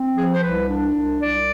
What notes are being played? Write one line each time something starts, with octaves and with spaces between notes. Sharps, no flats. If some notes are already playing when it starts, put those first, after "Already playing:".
Already playing: C4
F3 G#4
C5
C2 B4
D4
C2
C2 D5